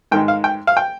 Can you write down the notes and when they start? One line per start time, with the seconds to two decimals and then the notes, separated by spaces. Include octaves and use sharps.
0.11 G#2 D#3 G#3 G5
0.28 F5
0.44 G5
0.67 F5
0.77 G5